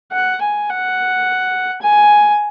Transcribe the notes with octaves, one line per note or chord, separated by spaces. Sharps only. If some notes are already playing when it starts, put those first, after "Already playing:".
F#5
G#5
F#5
G#5